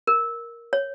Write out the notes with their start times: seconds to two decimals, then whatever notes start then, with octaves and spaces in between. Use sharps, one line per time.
0.07 A#4
0.73 C#5